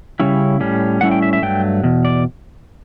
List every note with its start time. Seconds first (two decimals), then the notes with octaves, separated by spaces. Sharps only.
0.20 C#3 G3 C#4 E4
0.60 A2 G3 C#4
1.01 A2 G3 C#4 E4 F#5
1.11 G5
1.22 E5
1.33 E5
1.42 G2 F#3 A3 G5
1.84 E2 B2
2.05 D5